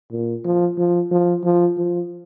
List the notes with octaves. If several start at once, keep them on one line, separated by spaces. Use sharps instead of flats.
A#2
F3
F3
F3
F3
F3